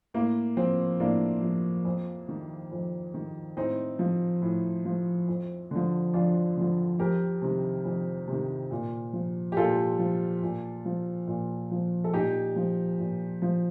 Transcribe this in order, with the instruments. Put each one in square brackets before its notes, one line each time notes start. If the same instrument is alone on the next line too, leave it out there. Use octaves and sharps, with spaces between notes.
[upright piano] A2 A#3
F3 C4
A2 A#3 D4
F3
F2
D#3
F2
D#3
A2 C4 D#4
F3
A2
F3
F2
D3 F3
F2 D4 F4
D3 F3
F2 G4 A#4
C3 D#3
F2
C3 D#3
A#2
F3
G4
A#2 F4 A4
F3
A#2
F3
A#2
F3
A4
A#2 D#4 G4
F3
A#2
F3